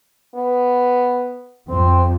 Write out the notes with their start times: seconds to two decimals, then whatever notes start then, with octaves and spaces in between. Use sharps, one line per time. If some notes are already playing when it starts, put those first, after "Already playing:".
0.36 B3
1.69 F2 C4